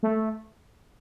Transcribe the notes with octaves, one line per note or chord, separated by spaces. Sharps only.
A3